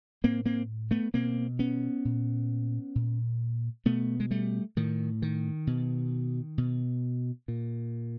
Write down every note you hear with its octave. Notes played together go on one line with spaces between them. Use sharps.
A2 A#3 C4
A#3 C4
A3 B3
B2 A#3 C4
B3 C#4
A#2
A#2
B2 A3 B3
G#3
G3 A3
A2 D#3
D#3
B2
B2
A#2